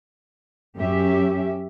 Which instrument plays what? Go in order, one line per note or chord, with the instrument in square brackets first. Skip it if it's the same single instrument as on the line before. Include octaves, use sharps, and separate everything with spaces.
[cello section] F#2 C#4 G4 E5